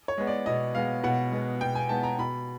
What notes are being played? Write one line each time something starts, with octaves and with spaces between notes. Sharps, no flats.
C#5
G#3 B3
D5
B2 D#5
G#3 B3 F5
B2 F#5
G#3 B3
B2 G5
G#5
G#3 B3 A5
A#5
B2 B5